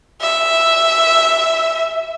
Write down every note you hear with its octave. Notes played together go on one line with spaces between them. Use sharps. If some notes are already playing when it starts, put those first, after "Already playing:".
E5